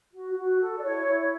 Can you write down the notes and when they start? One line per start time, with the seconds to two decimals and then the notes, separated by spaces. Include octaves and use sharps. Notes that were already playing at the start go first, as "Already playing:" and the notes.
0.12 F#4
0.35 F#4
0.60 A4
0.78 D5
0.82 E4 C#5
1.07 E4